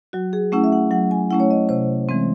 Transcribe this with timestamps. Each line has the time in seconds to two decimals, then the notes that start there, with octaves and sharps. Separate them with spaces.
0.13 F#3 F#4
0.33 G#4
0.52 A3 C#4 E4 F#5
0.64 E5
0.72 F#5
0.91 F#3 F#5
1.11 G#5
1.30 A3 C#4 E4 F#5
1.40 C#5
1.51 D#5
1.69 C3 C5
2.09 E3 G#3 C4